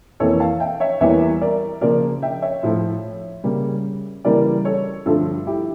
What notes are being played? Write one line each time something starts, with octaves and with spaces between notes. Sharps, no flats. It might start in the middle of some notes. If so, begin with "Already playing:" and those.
F2 E3 A#3 A4 C#5
F5 A5
E5 G5
C#5 E5
E2 E3 G3 A#3 C#5 E5
A#4 D5
C#3 F3 A#3 A#4 D5
E5 G5
C#5 E5
A2 F3 A3
C#3 G3 A#3
C#3 E3 G3 A#3 A#4 D5
A4 C#5
G2 D3 F3 A3 F4 A4
E4 G4